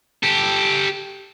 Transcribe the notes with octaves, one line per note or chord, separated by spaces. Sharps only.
G4 A4